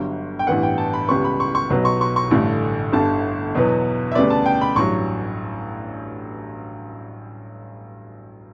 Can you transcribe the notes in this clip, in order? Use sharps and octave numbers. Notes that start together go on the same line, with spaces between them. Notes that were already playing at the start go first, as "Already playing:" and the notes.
Already playing: G1 G2 F#3
G5
A1 G2 E3 B3 F#5
G5
A5
B5
C#2 C#3 G3 B3 C#6
B5
C#6
C#6
B1 B2 F#3 B3
C#6
C#6
C#6
A1 G2 D3 A3
G1 G2 D3 A5
E2 B2 F#3 B3
E5
D2 C#3 G3 B3 D5
A5
G5
B5
A1 G2 F#3 C#6